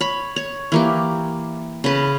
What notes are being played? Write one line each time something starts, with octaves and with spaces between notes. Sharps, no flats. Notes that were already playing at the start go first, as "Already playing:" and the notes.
C#5 B5
C#5
E3 A#3 G4
C#3 B4